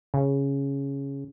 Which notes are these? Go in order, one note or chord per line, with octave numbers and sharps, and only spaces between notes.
C#3